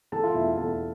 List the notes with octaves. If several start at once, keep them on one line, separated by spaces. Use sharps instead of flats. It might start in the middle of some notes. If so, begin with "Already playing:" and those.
E3 A4 A5
F4 F5
E2 E4 E5
E4 E5
E2 A4 A5